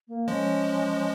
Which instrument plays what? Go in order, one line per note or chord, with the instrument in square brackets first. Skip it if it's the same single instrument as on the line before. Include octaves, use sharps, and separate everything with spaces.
[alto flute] A#3
[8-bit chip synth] F3 G#3 [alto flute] C#4